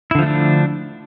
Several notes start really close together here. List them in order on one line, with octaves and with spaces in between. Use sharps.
E4 D3 F3 A3 D4